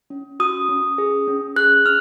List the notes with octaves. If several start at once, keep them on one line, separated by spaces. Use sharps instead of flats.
C#4
F#4 D#6
C#4
G#4
C#4
G#4 F#6
C#4 F6